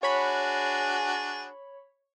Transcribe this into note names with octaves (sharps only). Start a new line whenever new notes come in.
D4 F#4 G#4 C#5 B5